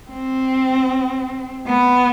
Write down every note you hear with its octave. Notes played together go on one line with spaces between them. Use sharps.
C4
B3